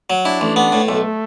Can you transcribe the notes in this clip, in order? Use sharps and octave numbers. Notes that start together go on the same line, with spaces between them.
F#3
D4 E4
A1
B3
A2
B1 A3